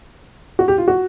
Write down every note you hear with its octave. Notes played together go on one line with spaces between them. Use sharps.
F#4
G4
F4
F#4